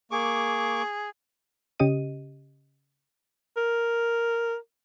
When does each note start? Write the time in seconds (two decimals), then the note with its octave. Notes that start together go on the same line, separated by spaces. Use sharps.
0.11 A#3 G#4 C#6 D6
1.80 C#3 C#4 G4 D#5 D#7
3.57 A#4